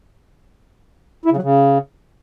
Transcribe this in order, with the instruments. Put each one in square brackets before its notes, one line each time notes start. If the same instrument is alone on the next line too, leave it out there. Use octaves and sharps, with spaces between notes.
[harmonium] E4
C#3
F#3
C#3